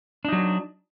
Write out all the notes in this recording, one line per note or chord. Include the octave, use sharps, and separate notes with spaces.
F#3 D4 D#4